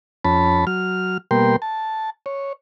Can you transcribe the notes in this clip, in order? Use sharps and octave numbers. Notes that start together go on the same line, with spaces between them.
F2 C#4 A5 B5
F#3 F6
B2 G3 A#3 A#4 G5 C6
A5
C#5